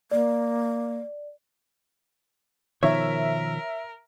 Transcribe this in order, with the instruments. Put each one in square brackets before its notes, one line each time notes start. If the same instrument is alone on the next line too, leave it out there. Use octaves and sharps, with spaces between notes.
[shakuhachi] A#3 [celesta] D5
[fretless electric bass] B2 D#3 F3 [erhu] A#4 [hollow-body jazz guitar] C#5 [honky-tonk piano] E5